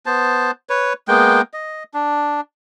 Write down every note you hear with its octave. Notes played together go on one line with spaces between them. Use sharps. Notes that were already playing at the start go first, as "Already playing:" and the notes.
B3 C5 A5
B4 C#5
G#3 A#3 B3 G5
D#5
D4